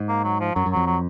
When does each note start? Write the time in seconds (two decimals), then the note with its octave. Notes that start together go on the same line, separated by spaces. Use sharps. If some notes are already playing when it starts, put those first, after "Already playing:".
Already playing: G#2
0.08 A#3
0.24 F#3
0.40 F3
0.55 F#2 F#3
0.66 F#2
0.72 F2 F#3
0.86 F#3